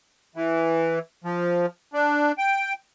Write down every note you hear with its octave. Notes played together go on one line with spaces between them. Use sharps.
E3
F3
D4
G5